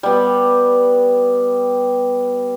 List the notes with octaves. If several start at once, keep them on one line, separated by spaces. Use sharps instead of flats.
G3 B3